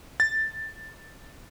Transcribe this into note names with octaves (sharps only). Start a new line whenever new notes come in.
A6